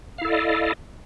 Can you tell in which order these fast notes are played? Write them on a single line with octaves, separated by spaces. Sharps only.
F5 E4 A4 D5 D#5